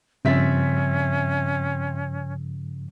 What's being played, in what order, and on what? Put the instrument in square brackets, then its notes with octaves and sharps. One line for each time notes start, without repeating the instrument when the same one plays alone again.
[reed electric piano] G2 F3 A6 [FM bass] C#3 [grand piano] C4 E5 B6 [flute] C#4